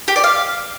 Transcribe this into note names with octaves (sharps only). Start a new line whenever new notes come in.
G4
D5
F5